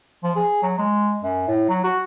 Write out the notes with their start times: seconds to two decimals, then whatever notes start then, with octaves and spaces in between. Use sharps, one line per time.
0.23 F3
0.36 G#4
0.62 F#3
0.78 G#3
1.23 F#2
1.48 A2
1.69 F#3
1.84 F#4